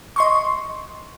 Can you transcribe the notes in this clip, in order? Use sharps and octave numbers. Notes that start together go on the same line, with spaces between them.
D#5 C6 C#6